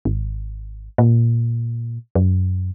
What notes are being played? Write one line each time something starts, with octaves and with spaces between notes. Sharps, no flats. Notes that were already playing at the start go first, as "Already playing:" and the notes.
G#1
A#2
F#2